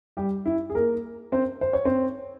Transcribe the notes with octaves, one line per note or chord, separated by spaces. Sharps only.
G3 G4
E4
G#4
A#3 A#4
C4 C5
C5
C#5
C4 C5